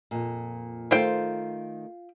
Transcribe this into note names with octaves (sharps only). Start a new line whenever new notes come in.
F2 A#2
D#3 A3 F4 C5 G5